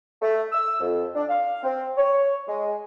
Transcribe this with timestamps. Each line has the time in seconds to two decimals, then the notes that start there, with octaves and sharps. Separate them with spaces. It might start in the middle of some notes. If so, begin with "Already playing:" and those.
0.22 A3
0.52 E6
0.80 F2
1.15 D4
1.29 F5
1.63 C4
1.97 C#5
2.48 G#3